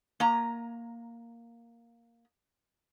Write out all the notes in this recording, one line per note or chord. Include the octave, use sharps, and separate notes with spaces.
A#3 A#5